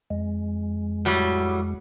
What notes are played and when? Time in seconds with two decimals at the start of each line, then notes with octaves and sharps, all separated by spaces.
0.10 F2 G#3
1.05 A2 F#3 G3